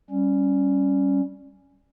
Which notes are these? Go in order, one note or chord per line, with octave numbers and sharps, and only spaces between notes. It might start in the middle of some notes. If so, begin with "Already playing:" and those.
G3 C#4